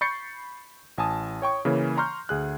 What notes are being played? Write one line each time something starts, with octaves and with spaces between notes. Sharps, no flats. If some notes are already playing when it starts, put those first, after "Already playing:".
B5 C#6 G6 A6 C7 C#7
A1 G#5 A5 D#6
C#5 G5 C#6
C#3 E3 A#3 C#4
A#5 C6 C#6 F6 G6
D2 G#4 F#6